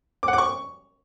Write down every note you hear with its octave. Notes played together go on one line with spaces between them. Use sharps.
D6
F#5
D6
C#6